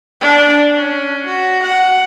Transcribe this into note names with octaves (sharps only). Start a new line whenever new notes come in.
D4
C#4
F#4
F#5